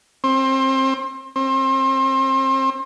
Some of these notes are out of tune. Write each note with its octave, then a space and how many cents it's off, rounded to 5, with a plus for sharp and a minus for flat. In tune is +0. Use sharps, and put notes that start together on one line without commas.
C4 +25
C4 +30